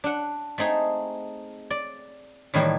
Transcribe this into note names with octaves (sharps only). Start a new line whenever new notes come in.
D4 F#5
A3 C4 D#4 G#4
D5
A2 D#3 E3 G3 A#3